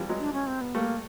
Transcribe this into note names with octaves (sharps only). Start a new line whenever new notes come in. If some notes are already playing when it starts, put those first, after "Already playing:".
Already playing: E3 F3 G3
F#3 G#3
D4
C#4
C4
B3
G3 A3 A#3